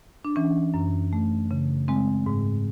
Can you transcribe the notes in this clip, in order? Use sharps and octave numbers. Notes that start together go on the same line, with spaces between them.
D4
E3 C#4
F#2
A3
C#3
G#3 C4
G#2